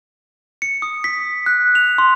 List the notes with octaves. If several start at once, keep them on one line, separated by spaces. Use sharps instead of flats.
C#7
D#6
B6
F#6
F7
C6